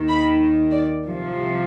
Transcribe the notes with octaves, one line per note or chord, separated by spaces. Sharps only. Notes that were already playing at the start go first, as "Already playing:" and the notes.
Already playing: D#2 D#3
B5
D5
C2 C3 F3